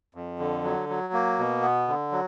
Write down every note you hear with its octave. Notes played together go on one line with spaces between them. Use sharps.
F2
D3
F#3
F#3
A#3
B2
B3
D3
F#3